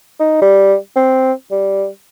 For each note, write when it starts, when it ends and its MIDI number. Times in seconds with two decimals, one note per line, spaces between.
0.20 0.40 63
0.42 0.75 55
0.96 1.32 60
1.51 1.87 55